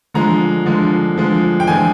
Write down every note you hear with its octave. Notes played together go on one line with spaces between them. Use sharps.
D3 F3 G#3 A#5
D3 F3 G#3
D3 F3 G#3
G5
D3 F3 G#3 G#5